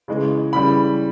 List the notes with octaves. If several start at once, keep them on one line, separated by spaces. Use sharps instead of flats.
C#3 E3 G#3
C#3 E3 G3 B5